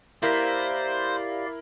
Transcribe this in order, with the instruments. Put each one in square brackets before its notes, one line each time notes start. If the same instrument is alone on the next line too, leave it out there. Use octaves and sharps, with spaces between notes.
[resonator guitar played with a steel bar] A#3 [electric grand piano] E4 A#4 B6 [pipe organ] G4 D5 F5 [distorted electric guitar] C5